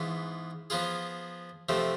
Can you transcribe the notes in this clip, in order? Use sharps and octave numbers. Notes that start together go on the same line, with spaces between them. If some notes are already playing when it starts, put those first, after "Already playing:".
Already playing: G#2 E3 B3 F4
F3 B3 F4 G#4
C3 F3 A3